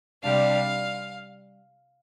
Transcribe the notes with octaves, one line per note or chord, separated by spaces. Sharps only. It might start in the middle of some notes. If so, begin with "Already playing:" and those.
C3 G3 D4 F5